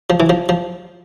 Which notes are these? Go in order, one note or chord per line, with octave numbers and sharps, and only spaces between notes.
F3
E3
F3
F3